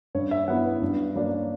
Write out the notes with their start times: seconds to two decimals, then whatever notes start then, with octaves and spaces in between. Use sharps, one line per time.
0.15 G2 C#5
0.31 E5
0.48 F#3 B3 E4 F#5
0.65 B4
0.82 G2
1.15 F#3 A#3 D4